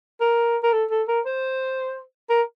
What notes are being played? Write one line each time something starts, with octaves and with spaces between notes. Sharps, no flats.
A#4
A#4
A4
A4
A#4
C5
A#4